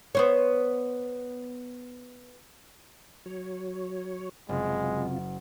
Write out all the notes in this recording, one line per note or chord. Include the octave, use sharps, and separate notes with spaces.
B3 C5 C#5
F#3 C#5
F#1 C3 G#3 F4